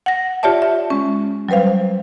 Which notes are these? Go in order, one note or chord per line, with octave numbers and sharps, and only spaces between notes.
F#5 A#6
F4 G4 C#5 D5 E5 A5
E5
G#3 C#4
F#3 G3 B4 C5 F5